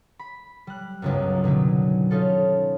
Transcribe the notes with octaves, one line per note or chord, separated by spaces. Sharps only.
B5
G3 F#6
G1 C#2 F#2
B2 D3 D#3 F#3
C#4 D#4 F4 A4